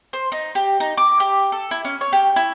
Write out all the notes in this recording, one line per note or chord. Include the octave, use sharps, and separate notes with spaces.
C5
D#4
G4
D#4
D6
G4
A4
E4
C#4
C#5
G4
E4